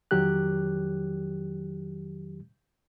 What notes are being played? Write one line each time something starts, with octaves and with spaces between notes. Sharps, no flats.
F2 D#3 F#3 G4 F#6